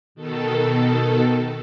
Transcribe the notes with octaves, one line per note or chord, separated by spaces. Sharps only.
B2 D#3 A4